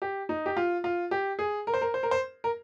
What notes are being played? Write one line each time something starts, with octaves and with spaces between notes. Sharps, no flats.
G4
D#4
G4
F4
F4
G4
G#4
A#4
C5
A#4
C5
A#4
C5
A#4